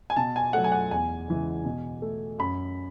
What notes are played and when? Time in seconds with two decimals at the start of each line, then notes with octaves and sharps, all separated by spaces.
0.10 G#5
0.16 B2 A5
0.36 G#5
0.53 F#3 A3 F#5
0.64 G#5
0.72 F#5
0.91 E2 G#5
1.28 C#3 E3 G#3
1.64 B2
2.02 A3
2.39 F#2 B5